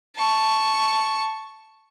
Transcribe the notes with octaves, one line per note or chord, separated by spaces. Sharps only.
A5 C#6